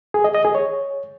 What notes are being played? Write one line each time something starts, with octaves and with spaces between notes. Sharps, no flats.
G#4
D#5
D#5
G#4
C#5